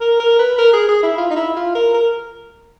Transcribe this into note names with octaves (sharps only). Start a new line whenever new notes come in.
A#4
A#4
B4
A#4
G#4
G#4
E4
F4
D#4
E4
F4
A#4
A#4